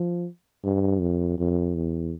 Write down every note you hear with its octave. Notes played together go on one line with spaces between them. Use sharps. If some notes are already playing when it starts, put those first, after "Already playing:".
Already playing: F3
G2
F2
F2
E2